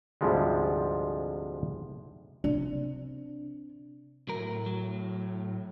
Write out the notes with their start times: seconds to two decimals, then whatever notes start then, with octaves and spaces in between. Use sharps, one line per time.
0.21 D2 G#2 C3 F3 G3 G#3
2.44 C3 D4
4.28 A2 F#3 A#4
4.66 F#3